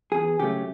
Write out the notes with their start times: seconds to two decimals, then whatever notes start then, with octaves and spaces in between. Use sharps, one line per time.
0.12 E2 G#4
0.40 C#3 F#3 A3 G4